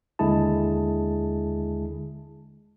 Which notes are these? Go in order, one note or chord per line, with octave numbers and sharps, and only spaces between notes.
D#2 D3 G#3 E4 G#4 A5